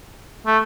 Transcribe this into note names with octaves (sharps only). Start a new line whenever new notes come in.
A3